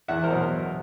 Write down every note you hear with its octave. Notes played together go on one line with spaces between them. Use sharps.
E2 E5 F#5
A#4 C5
B2 F#3